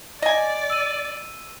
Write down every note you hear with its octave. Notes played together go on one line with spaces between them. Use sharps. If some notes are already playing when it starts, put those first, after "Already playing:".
D5 D#5 G#5
E6 D#7